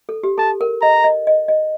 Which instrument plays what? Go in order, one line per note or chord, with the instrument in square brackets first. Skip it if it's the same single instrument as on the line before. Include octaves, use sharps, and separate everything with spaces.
[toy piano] A4
G4
[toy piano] A4 [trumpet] A5
[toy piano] A#4
[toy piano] D#5 [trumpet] A#5
[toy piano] D#5
D#5
D#5